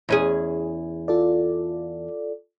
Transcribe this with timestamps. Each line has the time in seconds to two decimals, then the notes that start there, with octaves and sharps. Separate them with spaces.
0.09 E2 C#4 G#4
1.08 F4 A4 D5